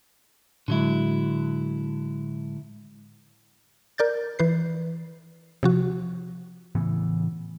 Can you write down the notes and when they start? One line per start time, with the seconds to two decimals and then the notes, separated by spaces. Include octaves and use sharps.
0.68 A2 D3 F#3 G#3 E4
3.98 A#4 D5 G6 A6
4.39 E3 B4 C7
5.63 C3 F3 F#4
6.75 A2 C#3 E3 B3